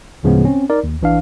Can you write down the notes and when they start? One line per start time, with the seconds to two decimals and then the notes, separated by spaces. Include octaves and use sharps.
0.23 D2 A2 C#3 F3 G#3 B3
0.45 C4 C#4
0.70 D#4 A#4 D5
0.84 D#2
1.01 A#1 E3 D4 F5